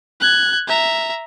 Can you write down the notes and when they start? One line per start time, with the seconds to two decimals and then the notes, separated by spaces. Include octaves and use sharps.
0.21 F#6 G#6
0.68 E5 A#5